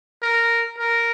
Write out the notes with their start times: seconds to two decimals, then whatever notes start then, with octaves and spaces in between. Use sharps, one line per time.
0.23 A#4
0.79 A#4